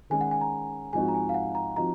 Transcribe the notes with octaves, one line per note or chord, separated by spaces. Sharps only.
D#3 G#3 C#4 G#5
F#5
G#5
A#5
G#2 F3 C4 D#4 F#4 G#5
A#5
G#5
F5
F#5
A#5
F3 C4 D#4 F#4 A#5